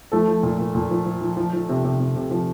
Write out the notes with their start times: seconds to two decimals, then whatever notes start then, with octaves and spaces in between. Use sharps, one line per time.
0.12 F3 A3 A4
0.28 F3
0.43 A#2
0.59 A#2
0.75 A#2
0.91 F3
1.06 F3
1.21 F3
1.37 F3
1.53 F3
1.69 C3
1.84 C3
2.00 C3
2.16 C3
2.31 F3